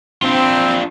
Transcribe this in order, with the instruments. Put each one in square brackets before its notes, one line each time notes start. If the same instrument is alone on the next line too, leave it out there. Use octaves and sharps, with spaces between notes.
[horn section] C4 [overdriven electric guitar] D4 F4